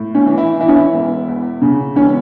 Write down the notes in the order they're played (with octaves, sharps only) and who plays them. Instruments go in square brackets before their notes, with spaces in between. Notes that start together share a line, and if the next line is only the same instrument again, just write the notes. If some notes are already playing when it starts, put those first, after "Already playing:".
Already playing: [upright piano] A2
C#4
E3
E4
E3 E4
C#4
E4
E1
E2
C#3
E1 C#4